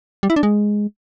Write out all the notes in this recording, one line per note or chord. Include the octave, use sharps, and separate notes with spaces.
G3
E4
D4
G#3